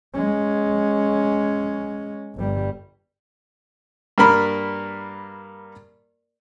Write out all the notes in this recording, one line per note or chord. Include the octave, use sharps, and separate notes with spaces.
G#3 C#4
G1 G3
G2 A#3 A#4 B5